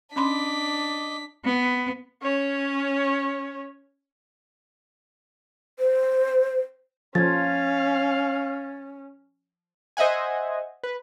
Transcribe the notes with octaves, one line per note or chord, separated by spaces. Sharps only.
C#4 D4 D#5 B5 C6 D6 B6
B3
C#4 C#5
C5
F3 C#4 F5 G#6 A6
C5 D#5 E5 F#5 G#5
B4